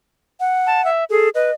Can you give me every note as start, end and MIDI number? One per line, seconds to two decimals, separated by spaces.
0.40 0.90 78
0.67 0.84 81
0.85 1.04 76
1.10 1.30 68
1.10 1.29 69
1.35 1.51 71
1.35 1.54 75